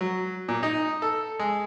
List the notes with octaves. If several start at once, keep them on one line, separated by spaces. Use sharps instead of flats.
F#3
A#2
D#4
A4
G#3